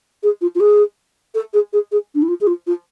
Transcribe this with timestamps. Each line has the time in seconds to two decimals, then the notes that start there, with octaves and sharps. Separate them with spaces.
0.23 G#4
0.41 F4
0.55 F4
0.60 G#4
1.34 A4
1.53 G#4
1.73 G#4
1.92 G#4
2.15 D4
2.22 E4
2.28 F4
2.41 G#4
2.47 F4
2.67 F4